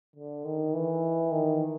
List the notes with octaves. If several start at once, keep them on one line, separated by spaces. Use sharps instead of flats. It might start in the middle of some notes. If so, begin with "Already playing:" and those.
D3
D#3
E3
D#3